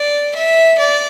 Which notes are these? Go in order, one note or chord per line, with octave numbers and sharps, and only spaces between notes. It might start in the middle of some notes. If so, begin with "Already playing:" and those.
Already playing: D5
E5
D5